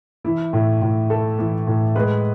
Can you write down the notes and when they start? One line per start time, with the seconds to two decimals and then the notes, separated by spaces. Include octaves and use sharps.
0.24 E3 E4
0.53 A2
0.82 A2
1.10 A3 A4
1.39 E3
1.67 A2
1.95 G#3 B4